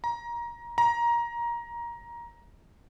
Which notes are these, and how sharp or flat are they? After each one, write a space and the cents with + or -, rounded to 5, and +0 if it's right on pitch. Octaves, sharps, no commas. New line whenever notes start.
A#5 +20
A#5 +15